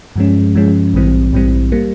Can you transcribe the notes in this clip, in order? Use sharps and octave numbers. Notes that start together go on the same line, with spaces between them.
G2 F3 G#3 C#4
G2 F3 G#3 C#4
A#1 G#2 E3 G3 C4
A#1 G#2 E3 G3 C4
G3 A#3